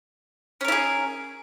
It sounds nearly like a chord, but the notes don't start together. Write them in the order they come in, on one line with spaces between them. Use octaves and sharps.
C#4 A#4 E4 G#4